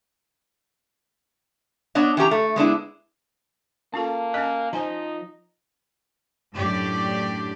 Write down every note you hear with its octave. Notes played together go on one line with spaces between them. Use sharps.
B3 D4 C#5 D#5
E3 C#4 G4 A#5
A3
G#3 B3 D4 E4
A#3 C#4 F4 A4 A5
C#4 D#5 G#5 F6 F#6
F3 D#4 C5 D#5 G#5 A#5
F#2 A2 D4 G4 D5